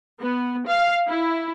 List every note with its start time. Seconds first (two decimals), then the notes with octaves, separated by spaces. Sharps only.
0.23 B3
0.69 F5
1.07 E4